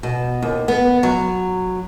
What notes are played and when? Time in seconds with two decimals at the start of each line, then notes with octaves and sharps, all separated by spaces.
0.03 B2
0.42 D#2
0.68 B3
1.03 F#3